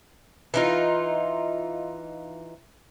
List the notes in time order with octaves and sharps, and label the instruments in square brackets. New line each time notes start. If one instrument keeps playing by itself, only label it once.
[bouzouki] E3 D#4 F4